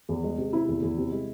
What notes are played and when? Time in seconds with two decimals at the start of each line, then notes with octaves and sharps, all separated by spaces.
0.09 E2
0.24 G#3
0.38 C3
0.53 C3 E4
0.68 E2
0.82 E2
0.98 C3
1.12 G#3